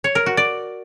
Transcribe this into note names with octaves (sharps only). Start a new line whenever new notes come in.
C#5
A#4
F#4
D5